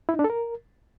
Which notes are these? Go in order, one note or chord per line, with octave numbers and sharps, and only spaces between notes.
E4
D#4
D4
A4
A#4